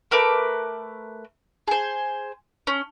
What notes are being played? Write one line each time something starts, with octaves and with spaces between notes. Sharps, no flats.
A3 A#4 B4 D6
G#4 C5
C#4